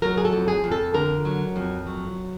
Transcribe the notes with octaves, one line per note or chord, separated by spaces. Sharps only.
F#3 A#4
G#4
A4
F2
G#4
F2
A4
D3 A#4
F#3
F2
F#3